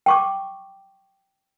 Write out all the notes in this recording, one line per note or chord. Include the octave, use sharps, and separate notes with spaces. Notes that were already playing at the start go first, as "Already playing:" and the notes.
G5 C#6 D6